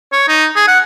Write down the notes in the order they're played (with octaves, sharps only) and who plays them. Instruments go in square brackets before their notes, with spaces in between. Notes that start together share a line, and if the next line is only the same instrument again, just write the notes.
[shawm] C#5
D#4
G#4
F#5